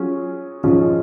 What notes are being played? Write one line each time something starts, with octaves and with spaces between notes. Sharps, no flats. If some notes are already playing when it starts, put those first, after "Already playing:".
Already playing: F#3 C#4 F4 G#4
G#2 F3 G#3 C#4 F4